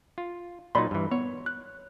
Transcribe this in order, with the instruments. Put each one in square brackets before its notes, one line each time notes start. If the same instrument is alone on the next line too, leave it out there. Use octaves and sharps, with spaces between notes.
[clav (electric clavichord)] F4
[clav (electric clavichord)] A#2 F#3 D#4 [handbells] D5 B5 C6
[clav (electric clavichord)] G2 E3
[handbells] B3 [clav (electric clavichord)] C#5
[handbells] F#6